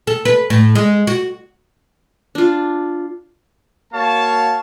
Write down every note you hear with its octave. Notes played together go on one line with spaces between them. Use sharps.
A4
B4
A2
G#3
F#4
D4 F4
A#3 F#4 C#5 F5 A5